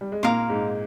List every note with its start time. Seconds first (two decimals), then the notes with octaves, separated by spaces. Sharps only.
0.01 G3
0.12 G#3
0.23 A#2 A#3 A#4 F5 C6
0.49 G#2 G#3